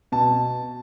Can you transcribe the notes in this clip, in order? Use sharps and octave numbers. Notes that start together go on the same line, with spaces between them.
B2 A5